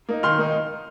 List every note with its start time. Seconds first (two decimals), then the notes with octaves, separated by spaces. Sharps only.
0.09 A#3 D#4
0.23 D#3 C6 F6
0.38 A#3 D#4